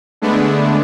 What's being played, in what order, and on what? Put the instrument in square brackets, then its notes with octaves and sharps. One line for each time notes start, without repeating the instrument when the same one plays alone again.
[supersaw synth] D3 G#3 A3 B3 D4